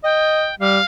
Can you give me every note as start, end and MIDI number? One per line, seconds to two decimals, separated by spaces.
0.04 0.48 75
0.04 0.55 79
0.60 0.79 55
0.60 0.85 77